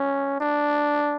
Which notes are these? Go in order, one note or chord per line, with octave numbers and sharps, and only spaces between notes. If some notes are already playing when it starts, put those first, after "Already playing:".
Already playing: C#4
D4